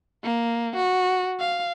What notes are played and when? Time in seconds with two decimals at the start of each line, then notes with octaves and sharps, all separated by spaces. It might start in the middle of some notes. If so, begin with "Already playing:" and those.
0.23 A#3
0.76 F#4
1.39 F5